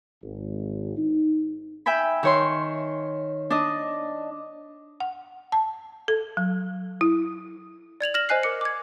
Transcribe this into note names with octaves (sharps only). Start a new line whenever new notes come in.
G#1
D#4
E5 G5 G#5 B5
D#3 C#5 C6
D4 D#5
F#5
A5
A4
F#3
E4
D5 G#6 F7 F#7
F6 A#6 E7 F#7
C5 D#5 G#5 F#6 C7
A#4 D6 C#7
D6 G#6